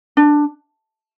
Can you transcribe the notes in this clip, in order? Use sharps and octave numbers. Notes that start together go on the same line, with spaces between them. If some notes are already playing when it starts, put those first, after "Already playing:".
D4